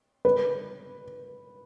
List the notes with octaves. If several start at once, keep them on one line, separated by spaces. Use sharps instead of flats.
B4